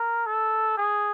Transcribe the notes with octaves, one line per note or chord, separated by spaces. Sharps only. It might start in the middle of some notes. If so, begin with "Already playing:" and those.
Already playing: A#4
A4
G#4